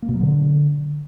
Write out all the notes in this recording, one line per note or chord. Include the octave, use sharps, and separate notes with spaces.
A#3
B2
F#3
D3